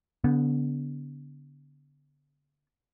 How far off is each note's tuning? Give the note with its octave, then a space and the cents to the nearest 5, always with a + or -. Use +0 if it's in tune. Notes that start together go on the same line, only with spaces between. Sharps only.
D3 -30 B3 +0